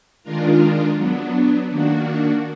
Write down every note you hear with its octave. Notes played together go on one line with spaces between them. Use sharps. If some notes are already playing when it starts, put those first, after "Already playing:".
D#3 G#3 D4 F4 A#4
F#3 B3 D4
D#3 A#3 D4 F#4